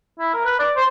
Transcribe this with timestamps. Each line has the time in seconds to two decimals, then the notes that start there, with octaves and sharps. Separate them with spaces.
0.19 E4
0.33 A#4
0.45 B4
0.59 D5
0.76 C5